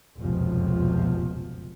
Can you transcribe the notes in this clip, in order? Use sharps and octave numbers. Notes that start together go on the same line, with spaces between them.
F1 C#2 F#2 B2 F3